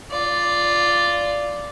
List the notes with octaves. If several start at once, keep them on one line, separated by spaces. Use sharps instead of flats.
F4 D5